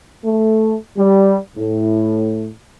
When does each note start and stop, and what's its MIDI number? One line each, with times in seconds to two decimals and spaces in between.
0.24 0.75 57
0.97 1.38 55
1.56 2.49 45